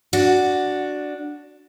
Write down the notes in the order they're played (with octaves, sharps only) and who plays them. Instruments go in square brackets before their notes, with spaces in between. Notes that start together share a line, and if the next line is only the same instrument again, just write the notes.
[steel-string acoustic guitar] D4 F#4